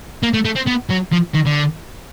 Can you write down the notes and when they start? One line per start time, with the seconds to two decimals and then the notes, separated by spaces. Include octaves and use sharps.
0.23 A#3
0.34 A3
0.45 A3
0.56 C4
0.67 B3
0.90 F#3
1.12 F3
1.34 D#3
1.46 D3